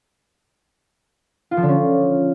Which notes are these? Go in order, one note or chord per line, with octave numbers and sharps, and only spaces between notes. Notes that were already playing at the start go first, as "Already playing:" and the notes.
F4
F3
D3
C#4